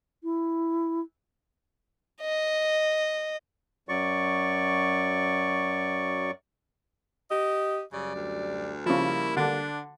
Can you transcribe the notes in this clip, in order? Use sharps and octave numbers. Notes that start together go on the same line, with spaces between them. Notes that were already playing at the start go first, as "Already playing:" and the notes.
E4
D#5
F#2 F#3 D5 C#6
G4 D#5
F#2 C#3 G3 D5
D2
C#3 F3 G3 A#3 E4
D3 D4